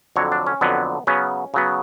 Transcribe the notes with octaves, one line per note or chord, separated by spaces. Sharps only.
F2 D3 F#3 C#5
D4
C#4
F2 D3 F#3 B3
C#3 F#3 B3 C#4
C#3 F#3 B3